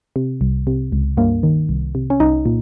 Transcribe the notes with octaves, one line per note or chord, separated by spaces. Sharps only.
C3
C2
C3
C#2
G2 A#3
D#3
C2
C3
C#4
C2 D#4
A#2